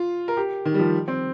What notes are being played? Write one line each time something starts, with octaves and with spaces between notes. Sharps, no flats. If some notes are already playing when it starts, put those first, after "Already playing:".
Already playing: F4
A#4
G4
D#3
G3
F3
C4